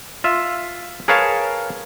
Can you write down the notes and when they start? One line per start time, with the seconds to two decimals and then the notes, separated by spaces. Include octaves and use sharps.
0.24 F4 E5
1.08 G#4 A#4 B4 C#5 F5 A5